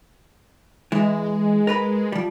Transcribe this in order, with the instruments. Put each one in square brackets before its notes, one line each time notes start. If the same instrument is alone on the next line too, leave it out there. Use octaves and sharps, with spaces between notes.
[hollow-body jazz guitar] E3 [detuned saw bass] G#3
[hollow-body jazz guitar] A#4 B4 B5
F3 G3